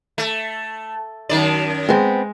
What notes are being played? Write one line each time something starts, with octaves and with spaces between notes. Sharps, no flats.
A3
F#2 D#3 D5
G#3 B3 C4